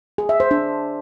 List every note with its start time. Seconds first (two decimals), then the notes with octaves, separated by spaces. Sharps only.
0.18 G#4
0.29 E5
0.40 C5
0.51 D4